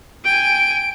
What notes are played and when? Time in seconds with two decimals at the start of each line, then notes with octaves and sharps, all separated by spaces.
0.24 G5 G#5 D7